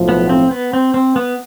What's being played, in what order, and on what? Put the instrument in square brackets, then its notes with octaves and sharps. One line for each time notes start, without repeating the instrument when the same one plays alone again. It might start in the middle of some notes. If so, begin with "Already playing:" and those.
Already playing: [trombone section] B1 A2 F3
[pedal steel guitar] B3
C4
B3
C4
C4
B3